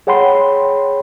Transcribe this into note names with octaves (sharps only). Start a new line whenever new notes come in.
G#4 C#5 F#5 G5 B5 C6